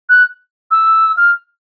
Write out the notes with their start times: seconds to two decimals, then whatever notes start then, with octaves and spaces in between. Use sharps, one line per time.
0.09 F#6
0.71 E6
1.17 F6